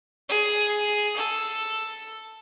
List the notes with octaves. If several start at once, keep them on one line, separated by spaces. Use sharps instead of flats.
G#4
A4